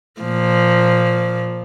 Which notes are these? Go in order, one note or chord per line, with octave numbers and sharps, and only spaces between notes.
A#2 F3